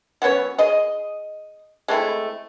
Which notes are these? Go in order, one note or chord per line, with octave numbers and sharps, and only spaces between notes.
F#3 B3 C#4 C#5
G#4 D#5
G#3 A3 C4 E4